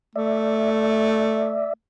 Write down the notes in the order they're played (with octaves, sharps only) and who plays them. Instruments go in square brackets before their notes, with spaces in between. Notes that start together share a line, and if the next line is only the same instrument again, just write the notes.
[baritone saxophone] A3 [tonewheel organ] D5 E5